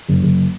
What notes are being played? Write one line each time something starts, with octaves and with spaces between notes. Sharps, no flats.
F#1
F#1